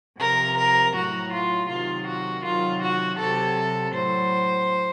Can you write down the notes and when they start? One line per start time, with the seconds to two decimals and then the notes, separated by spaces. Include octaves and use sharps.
0.20 C3 F3 A#4
0.57 A#4
0.94 A2 F#3 F#4
1.32 F4
1.69 C3 D#3 F#3 F4
2.07 F#4
2.44 C3 D#3 F#3 F4
2.82 F#4
3.18 C3 F#3 A4
3.94 A2 F#3 C5